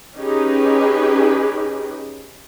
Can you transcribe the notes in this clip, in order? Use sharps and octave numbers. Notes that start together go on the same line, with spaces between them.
C#4 D#4 G4 G#4 B4